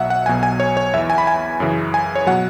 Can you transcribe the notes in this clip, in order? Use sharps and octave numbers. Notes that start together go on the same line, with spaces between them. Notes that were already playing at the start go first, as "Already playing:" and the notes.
Already playing: B1 B2 F#3 E5 F#5
F#5
B1 B2 F#3 G#5
G#5
C#5
C#5
E2 E3 E5
G#5
B5
G#5
F#2 C#3 E3
G#5
C#5
B2 F#3 F#5